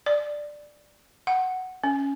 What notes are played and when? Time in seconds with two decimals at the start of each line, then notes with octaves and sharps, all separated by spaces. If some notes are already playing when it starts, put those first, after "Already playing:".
0.06 D5
1.27 F#5
1.84 C#4